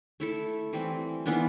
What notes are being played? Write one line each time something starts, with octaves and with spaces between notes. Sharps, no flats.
A3 E4 A4
E3 G3 C4
E3 B3 D4 F4